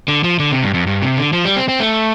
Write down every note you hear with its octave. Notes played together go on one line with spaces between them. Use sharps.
D3
F3
D3
C3
G2
F2
G2
C3
D3
F3
G3
C4
C4
A3